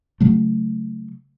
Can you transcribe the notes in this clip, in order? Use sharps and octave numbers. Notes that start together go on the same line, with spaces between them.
C#3 F#3 A3